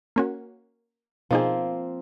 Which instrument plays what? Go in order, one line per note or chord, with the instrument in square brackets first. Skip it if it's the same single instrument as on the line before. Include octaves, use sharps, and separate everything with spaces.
[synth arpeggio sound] A#3 C#4 F#4
[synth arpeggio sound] B2 D#4 G#4 [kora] F3 A#3 C4